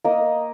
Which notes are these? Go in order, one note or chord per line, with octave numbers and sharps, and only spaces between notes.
A#3 D#5